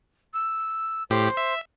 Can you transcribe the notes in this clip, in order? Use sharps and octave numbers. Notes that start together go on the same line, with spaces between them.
E6
A2 G4 C5
E5